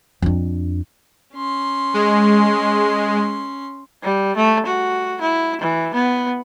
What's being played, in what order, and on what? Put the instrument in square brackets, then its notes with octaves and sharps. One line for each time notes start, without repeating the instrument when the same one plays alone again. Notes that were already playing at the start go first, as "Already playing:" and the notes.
[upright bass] F2 D4
[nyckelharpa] C#4 C6
[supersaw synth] G#3
[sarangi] G3
A3
F#4
E4
E3
B3